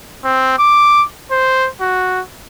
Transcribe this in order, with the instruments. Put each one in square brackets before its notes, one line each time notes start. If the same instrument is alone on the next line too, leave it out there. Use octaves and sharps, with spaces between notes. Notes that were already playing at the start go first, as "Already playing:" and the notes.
[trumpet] C4
D6
C5
F#4